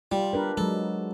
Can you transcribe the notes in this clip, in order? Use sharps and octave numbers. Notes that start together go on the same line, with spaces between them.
G3 F4
D4 A#4 B4
F#3 G#3 A4